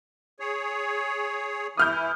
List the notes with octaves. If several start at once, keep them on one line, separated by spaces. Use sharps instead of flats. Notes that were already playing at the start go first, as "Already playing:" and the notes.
G#4 C#5
E3 E4 D#6 F6 G6